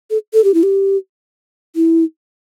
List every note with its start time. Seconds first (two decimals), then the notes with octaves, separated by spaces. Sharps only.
0.10 A4
0.33 A4
0.44 G4
0.54 E4
0.63 G4
1.76 E4